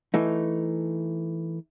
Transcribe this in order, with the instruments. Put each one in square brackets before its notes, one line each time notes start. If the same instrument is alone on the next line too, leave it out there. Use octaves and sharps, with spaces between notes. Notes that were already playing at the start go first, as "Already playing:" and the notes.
[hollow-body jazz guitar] E3 A3 D#4